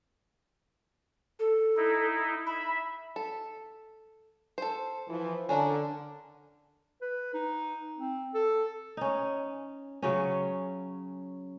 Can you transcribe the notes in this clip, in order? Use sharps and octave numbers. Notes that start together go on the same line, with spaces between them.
A4
D#4 E4
E5 B5
A4
A4 C5
E3 F3
D3 C#4 D4 A#4
B4
D#4
C4
A4
C#4 D#4
C#3 F#3 C#4